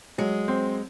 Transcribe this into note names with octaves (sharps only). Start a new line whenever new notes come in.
F#3 G#3
C4